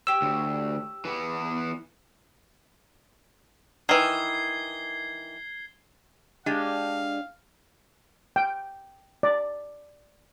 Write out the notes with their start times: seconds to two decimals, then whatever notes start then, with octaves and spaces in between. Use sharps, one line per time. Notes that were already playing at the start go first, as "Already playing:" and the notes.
0.07 G4 C#5 E6
0.22 D2
1.05 E3 B3
3.89 D#3 E3 G#6 C7 G7
6.46 G#3 D4 G4 F5
8.36 G5
9.23 D5